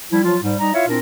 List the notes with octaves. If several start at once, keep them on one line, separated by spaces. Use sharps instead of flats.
F3 G3 E4
F3 F#3 F4
G#2 G3
G3 D#4 A#5
E4 F4 C#5 E5 F5
A#2 C4 D4 E4 A#4